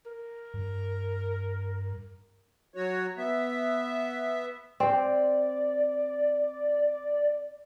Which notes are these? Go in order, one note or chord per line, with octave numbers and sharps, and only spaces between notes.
A#4
G2
F#3 F#4 C#5
B3 E5
C4 C5 D5